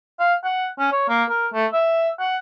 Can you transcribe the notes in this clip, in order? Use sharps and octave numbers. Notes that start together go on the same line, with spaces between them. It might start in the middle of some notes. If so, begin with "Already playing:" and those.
F5
F#5
C#4
C#5
A#3
A#4
A3
E5
F#5